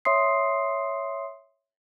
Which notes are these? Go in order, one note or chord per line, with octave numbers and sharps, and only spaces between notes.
C#5 E5 C6 D#6 C7